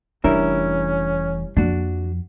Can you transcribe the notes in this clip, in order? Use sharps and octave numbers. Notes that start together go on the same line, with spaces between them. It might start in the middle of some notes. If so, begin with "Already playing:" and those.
F1 E3 G3 C#4 D4 E4 A#4
F2 F3 A#3 D4 F#4